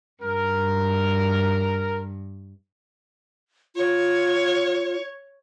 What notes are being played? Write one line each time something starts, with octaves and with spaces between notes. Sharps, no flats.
G2 A#4
F4 C#5